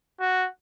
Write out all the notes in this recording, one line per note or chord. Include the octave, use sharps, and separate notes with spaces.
F#4